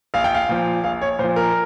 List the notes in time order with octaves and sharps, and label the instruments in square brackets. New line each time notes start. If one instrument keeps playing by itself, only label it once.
[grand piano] A#1 F5
G5
F5
A#2 F3
A#1 F5
C#5
A#2 C5
F3
A#4